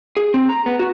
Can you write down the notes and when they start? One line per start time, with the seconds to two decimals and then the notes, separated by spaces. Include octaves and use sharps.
0.17 G#4
0.34 C4
0.49 A#5
0.66 B3
0.79 F#4